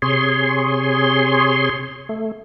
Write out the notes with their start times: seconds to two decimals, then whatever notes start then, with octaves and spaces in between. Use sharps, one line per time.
0.02 C3 G#4 C#5 C6
2.09 A3